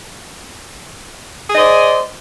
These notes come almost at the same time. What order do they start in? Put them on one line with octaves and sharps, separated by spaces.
G#4 D#5 C5 D5